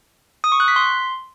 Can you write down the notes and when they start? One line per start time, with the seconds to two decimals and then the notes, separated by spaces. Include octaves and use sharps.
0.44 D#6
0.52 C#6
0.60 F#6
0.68 B6
0.76 C6